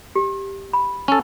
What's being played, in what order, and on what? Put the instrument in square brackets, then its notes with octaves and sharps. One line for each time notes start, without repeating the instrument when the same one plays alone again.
[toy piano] G4
B5
[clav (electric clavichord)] C#4 A4